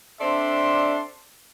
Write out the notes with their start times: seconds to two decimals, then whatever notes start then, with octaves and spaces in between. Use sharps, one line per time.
0.20 C4 D4 A4 D5 E5 C6